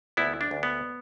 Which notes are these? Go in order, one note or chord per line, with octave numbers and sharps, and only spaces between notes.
D2 B3 E4
D4
D2
B3